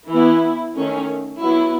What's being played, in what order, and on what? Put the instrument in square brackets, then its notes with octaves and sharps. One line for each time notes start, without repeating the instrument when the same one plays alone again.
[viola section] E3 B3 E4
D#3 A3 C#4
F#3 B3 E4